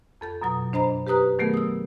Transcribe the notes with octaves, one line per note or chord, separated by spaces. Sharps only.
F2 A4 G6
F#2 B2 F#3 D#6
D4 C5 D#5 A#5 B5
G4 B4 A#5 D#6 F#6
D#3 F#3 A3 B3 G#4 A#4
D#6 E6